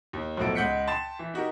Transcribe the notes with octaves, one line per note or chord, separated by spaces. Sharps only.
D#2
B1 A2 F3 F#4 A4 D7
C#2 G#3 F#5 G6 B6 C#7
G5 A5 C6 A6 E7
E3
D#4 F#4 G4 A#4